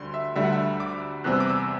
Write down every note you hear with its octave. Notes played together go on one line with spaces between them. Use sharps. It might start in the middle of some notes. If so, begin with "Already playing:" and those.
Already playing: D2 D3 G3 C6
E5
D2 D3 G3 E5
F#5
E5
D6
E2 C3 G3 C4 F#6
E6
D6
E6